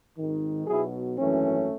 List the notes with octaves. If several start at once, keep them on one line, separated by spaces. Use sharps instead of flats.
G#1 G#2 D#3
B1 B2 F#3 E4 G#4
G#1 F#2 E3 A3 C#4